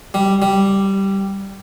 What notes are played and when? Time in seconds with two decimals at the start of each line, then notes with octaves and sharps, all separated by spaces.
0.14 G3
0.42 G3